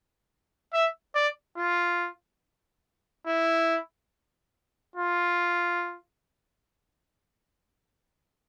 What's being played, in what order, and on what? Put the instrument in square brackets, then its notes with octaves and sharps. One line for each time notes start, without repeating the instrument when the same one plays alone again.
[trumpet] E5
D5
F4
E4
F4